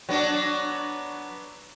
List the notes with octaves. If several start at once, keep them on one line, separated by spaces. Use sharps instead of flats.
F#3 B3 D4